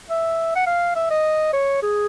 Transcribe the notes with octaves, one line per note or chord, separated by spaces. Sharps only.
E5
F#5
F5
E5
D#5
C#5
G#4